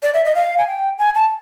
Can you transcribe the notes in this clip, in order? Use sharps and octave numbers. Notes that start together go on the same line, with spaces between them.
D5
E5
D#5
F5
G#5
G5
G#5
A5